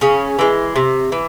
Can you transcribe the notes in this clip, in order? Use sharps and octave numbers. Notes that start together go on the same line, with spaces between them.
C#3 C#4
E3 G#3
C3
E3